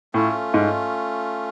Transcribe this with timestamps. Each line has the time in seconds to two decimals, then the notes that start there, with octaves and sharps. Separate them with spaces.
0.14 A2 A3 C#4 F4
0.54 G#2